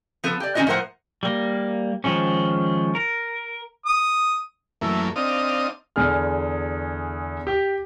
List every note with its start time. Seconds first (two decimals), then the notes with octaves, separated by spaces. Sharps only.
0.24 F3 B3 A4
0.40 G4 D5
0.55 D#3 C4 C#4 F4 F#4 D#5
0.67 A2 F3 A#4 C5 F#5
1.23 G3 A#3
2.04 D#3 F3 G#3 C#4
2.95 A#4
3.86 D#6
4.81 F#2 E3 A3 A#3
5.16 C4 D4 D#4 F5 D#6
5.96 E2 D3 G#4 F6
7.47 G4